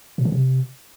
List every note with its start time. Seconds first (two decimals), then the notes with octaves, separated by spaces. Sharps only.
0.18 A#2
0.25 D3
0.32 C3